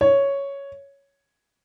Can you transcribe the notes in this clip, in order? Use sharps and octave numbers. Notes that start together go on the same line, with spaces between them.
C#5